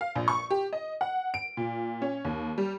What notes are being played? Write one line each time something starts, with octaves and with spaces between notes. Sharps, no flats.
F5
A#1
C#6
G4
D#5
F#5
D7
A#2
C#4
D#2
G3